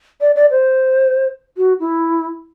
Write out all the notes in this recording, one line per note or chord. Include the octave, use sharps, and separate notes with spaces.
D5
D5
C5
F#4
E4